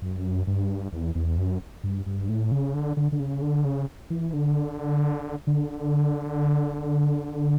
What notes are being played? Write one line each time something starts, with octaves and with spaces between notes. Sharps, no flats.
F#2
G2
E2
E2
F#2
G2
G2
A2
C#3
D3
D3
D3
C#3
D3
C#3
E3
D3
D3